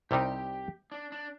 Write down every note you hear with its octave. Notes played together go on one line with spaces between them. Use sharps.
C2 C3 G3 C4 D#4 G4
D4
D4